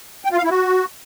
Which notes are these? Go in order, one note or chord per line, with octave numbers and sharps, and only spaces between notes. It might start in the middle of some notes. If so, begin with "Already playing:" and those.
G5
F4
F5
E4
F#4